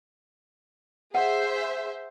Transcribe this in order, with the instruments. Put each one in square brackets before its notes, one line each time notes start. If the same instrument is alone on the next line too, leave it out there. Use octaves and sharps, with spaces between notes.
[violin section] G#4 C5 E5 [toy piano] F#5